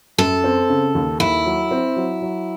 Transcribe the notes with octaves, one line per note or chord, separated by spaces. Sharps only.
F#2 A4
C4
C#3
D#2
D#2 E4
F#3
C4
F#3
F#3